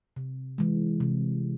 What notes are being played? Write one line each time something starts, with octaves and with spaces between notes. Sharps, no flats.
C3
E3 G#3
C3